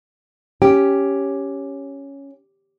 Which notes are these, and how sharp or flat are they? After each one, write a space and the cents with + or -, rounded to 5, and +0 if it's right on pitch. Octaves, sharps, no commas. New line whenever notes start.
C#4 +0 G4 +0 G5 +0